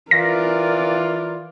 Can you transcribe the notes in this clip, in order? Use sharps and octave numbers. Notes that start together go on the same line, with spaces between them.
E3 F4 A#4 D5 A#6